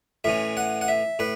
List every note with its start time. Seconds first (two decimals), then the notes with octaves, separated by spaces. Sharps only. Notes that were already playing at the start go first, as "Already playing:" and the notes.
0.24 A2 E3 C#4 E5
0.57 F#5
0.81 F#5
0.88 E5
1.19 A2 B4